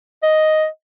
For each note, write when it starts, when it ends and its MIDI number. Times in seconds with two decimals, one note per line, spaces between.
0.23 0.67 75